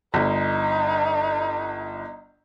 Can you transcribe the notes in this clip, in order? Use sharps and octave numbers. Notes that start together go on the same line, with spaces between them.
G1 D#4